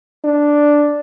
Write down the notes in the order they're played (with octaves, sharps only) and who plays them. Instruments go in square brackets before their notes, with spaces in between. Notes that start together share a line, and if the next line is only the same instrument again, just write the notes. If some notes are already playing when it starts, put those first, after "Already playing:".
[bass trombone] D4